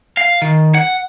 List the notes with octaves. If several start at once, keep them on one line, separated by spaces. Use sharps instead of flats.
F5
D#3
F#5